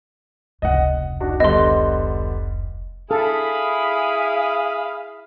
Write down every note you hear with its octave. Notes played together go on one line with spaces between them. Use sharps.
F1 C#2 D#5 F#5
D4 D#4 F#4
D3 G3 B3 D#5 C6
E4 G#4 A4 F5 B5